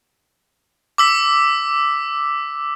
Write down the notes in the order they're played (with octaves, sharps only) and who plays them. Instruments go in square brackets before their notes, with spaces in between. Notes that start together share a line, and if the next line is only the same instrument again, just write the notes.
[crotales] D6 E6 B6